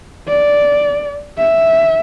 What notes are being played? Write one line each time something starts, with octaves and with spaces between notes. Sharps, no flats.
D5
E5